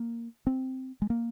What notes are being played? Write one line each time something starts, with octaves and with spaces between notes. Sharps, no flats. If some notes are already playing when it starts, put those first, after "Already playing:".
Already playing: A#3
C4
G#3
A#3